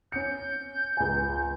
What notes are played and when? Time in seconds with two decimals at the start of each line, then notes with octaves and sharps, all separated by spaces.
0.12 C#4 G6 C#7
0.97 C#2 G#5